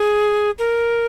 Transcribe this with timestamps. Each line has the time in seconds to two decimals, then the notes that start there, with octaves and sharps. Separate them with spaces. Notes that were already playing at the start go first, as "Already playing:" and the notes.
Already playing: G#4
0.59 A#4